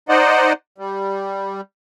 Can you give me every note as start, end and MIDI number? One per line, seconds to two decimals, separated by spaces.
0.09 0.53 63
0.09 0.53 72
0.09 0.53 74
0.09 0.53 75
0.09 0.53 78
0.78 1.61 55